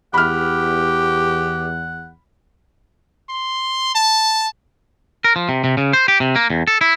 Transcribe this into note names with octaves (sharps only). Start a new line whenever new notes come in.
E2 G4 F#5 B5 F6
C6
A5
A#4
F3
C3
C3
C#3
C5
G4
C3
A#3
E2
A4
E4